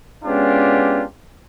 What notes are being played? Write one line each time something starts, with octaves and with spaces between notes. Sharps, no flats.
G#3 B3 C#4 D4 F4 G4